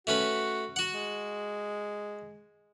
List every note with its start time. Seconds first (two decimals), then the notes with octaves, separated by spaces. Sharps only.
0.07 A3 C#4 F#4 B4
0.76 F#4 F#5
0.93 G#3